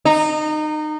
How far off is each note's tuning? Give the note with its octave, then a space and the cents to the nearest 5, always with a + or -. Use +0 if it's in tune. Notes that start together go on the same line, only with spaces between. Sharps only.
D#4 -25